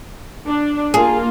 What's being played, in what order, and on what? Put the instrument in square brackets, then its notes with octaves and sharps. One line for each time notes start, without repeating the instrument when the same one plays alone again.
[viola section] D4
[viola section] A#3 F4 [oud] G#4